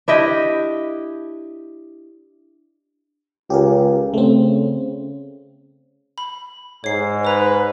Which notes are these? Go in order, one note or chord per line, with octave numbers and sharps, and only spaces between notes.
D4 E4 G4 D#5
C#2 G4 G#4 A#4
C#3 A3 C4
B5
G#2 C#5 C7
B4 C#5 A#5